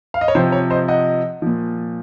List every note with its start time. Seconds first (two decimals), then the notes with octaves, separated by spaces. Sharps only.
0.14 F5
0.21 D#5
0.28 C#5
0.35 C3 F3 C5
0.52 C#5
0.70 C5 D#5
0.88 D#5 F#5
1.42 A#2 F3